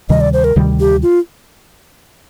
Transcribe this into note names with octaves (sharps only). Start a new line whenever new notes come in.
D2 C3 D#3 G3 D#5
D5
C5
A#4
D2 C3 D#3 G3
G4
F4